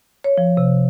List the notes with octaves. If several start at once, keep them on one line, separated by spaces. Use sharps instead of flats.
C#5
F3
C3